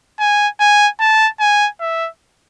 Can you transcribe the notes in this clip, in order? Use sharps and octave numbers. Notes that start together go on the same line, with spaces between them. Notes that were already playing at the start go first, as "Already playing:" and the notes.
G#5
G#5
A5
G#5
E5